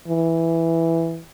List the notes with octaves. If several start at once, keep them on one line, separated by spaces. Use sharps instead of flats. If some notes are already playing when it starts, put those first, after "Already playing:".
E3